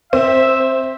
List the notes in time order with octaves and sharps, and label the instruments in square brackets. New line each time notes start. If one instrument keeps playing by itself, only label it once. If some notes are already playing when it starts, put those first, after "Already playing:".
[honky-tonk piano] C4 [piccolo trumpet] E5